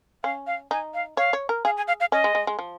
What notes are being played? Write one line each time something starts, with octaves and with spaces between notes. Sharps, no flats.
C#4 F5
F5
D#4 G#5
F5
C#5 F5
C#5
A#4
G#4 F5
G#5
F5
F5
C#4 D#5
G#3
G#3
G#3
F3